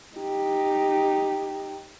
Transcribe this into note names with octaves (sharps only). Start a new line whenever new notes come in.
D#4 G4